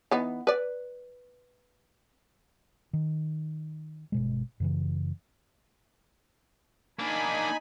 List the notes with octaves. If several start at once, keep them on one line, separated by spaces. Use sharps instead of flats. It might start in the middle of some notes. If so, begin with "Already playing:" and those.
E3 B3 D#4
B4 D5
D#3
G1 B2 G#3
F#2 C#3 E3
A#3 D4 D#4 G#5 B5